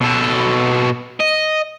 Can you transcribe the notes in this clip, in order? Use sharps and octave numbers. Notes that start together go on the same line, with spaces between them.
B2 A4
D#5